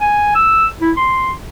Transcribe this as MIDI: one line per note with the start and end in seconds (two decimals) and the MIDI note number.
0.01 0.35 80
0.35 0.67 88
0.81 0.91 64
0.97 1.32 84